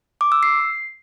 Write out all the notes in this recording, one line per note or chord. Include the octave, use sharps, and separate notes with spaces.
D6
E6
C7